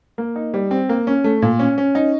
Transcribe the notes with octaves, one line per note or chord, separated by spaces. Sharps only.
A#3
D#4
G3
C4
A#3
C#4
A3
A#2
C#4
C#4
D#4